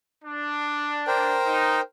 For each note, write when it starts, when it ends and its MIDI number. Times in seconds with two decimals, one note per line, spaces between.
0.23 1.36 62
1.07 1.81 70
1.07 1.81 72
1.07 1.81 79
1.46 1.77 63